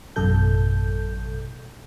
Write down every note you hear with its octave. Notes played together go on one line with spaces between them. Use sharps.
A1 F#2 B2 A4 G6